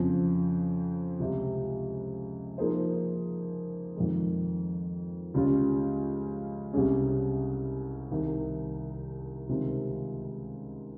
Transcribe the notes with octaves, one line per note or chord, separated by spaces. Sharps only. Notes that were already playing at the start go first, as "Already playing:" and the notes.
Already playing: F2 C#3 F3 C4
C#2 C3 G3
F3 A#3 D#4 G#4 C5
F2 D#3 G#3
C#2 C#3 G3 C#4 F4
C2 C3 G3 C#4 G#4
C2 C3 D#3
C#2 C3 D#3 G3 C4